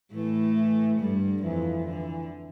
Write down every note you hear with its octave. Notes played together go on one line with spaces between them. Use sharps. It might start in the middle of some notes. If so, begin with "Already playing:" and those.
A2 E3 A3
E3
G2 D3 G3
F2 E3 F3
D3 E3